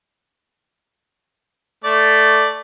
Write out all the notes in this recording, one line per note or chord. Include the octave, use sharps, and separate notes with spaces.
A3 D5